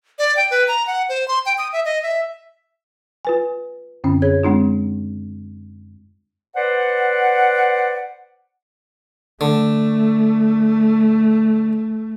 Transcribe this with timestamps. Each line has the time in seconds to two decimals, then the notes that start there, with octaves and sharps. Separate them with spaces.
0.19 D5
0.37 G5
0.51 B4
0.68 A#5
0.87 F#5
1.09 C5
1.28 C6
1.46 G5
1.58 D#6
1.73 E5
1.85 D#5
2.03 E5
3.25 F4 B4 G#5
4.04 F#2 D3 C4 C#4
4.22 G#4 C#5 G#6
4.43 G#3 C4 D4 F4
6.55 B4 C5 D5 F#5
9.41 D3 A3